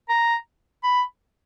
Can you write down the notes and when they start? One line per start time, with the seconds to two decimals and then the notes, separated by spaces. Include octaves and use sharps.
0.09 A#5
0.83 B5